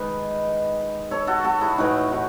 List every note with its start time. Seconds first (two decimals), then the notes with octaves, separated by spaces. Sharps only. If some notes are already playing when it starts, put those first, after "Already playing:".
Already playing: D#3 G#3 B4 D#5
1.11 A4 C#5
1.27 F#4 A4
1.44 F#4 A4
1.61 E4 G#4
1.78 A2 E3 A3 D#4 F#4
2.11 D#4 F#4